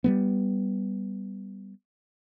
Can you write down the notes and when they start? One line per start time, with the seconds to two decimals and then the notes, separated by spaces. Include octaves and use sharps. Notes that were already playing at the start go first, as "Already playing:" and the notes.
0.04 G3 A3 B3